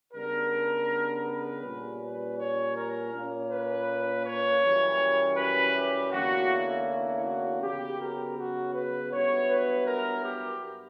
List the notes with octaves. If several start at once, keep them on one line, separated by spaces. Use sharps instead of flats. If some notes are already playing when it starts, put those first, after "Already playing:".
C#3 G3 B3 D4 A#4
B4
A#2 G3 C#4
B4
C#5
A#4
A#2 A#3 C#4
B4
C#5
F#2 E3 G3 C#4
B4
G4
E2 D3 A#3 C#4 F#4
E4
F#4
C#3 F#3 B3 G4
A#4
F#4
B4
G2 F#3 B3 E4 C#5
B4
A#4
G4